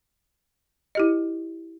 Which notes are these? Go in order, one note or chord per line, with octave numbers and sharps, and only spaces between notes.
E4 G4 D#5